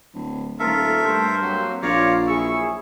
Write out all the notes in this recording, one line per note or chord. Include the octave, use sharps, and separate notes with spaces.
D1
D#1 A3 F4 A4 A#4 E5
G2 C5
F#3 A#3 C4 F#4
A#1 F4 C#5 D5 F5 A#5
F#2 E4 G#4 C#6 E6